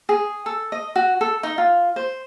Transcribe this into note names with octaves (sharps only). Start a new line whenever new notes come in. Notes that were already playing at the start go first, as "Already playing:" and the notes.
G#4
A4
D#5
F#4
A4
D#4
F4
C5